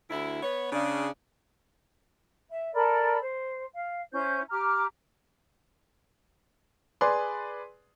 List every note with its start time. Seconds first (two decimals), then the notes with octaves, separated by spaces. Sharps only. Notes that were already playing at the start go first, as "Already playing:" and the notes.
0.10 D2 E4
0.43 B3 C#5
0.72 C#3 D4
2.49 E5
2.74 A4 A#4 D5 B5
3.22 C5
3.74 F5
4.12 C#4 E4 C5 G6
4.50 G4 A#5 D6 F6
7.01 G#4 B4 D5 C6